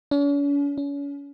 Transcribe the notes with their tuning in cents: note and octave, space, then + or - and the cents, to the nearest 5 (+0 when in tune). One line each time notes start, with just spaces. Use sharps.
C#4 +45
C#4 +35